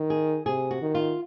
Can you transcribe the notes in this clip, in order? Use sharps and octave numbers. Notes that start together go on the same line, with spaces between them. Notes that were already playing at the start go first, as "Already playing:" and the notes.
Already playing: D#3
G#4
C3 G#4
F#4
D#3
F4